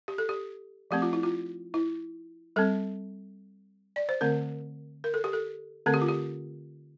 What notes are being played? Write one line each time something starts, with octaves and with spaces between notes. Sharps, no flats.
G4
A4
G4
F3 A3 C4 G4
F4
E4
F4
E4
G3 C4 A4
D5
C5
D3 A3 C4 A#4
A#4
A4
G4
A4
D3 A3 C4 A4
G4
F4
G4